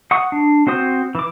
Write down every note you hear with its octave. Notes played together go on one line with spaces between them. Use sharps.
F#5 C#6 D#6
D4
C4 F#4 C5 D#6
E3 D6